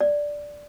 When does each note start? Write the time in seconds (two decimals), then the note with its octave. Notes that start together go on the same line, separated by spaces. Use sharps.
0.01 D5